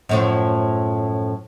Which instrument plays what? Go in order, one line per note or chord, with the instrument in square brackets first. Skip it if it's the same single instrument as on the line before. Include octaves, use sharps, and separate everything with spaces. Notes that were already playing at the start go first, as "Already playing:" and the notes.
[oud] F#2 A2 F3